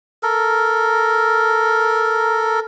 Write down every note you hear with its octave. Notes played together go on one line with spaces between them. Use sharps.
A4 A#4